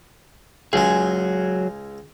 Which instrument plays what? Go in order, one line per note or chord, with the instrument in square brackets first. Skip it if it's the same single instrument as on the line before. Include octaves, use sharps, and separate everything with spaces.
[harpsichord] C#2 G#3 [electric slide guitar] F#3 G#4